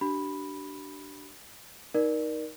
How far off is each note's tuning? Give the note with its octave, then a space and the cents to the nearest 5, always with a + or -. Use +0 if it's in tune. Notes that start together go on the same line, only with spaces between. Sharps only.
D4 +0 G4 -40 B5 +0
D#4 +5 A#4 +20 D5 +20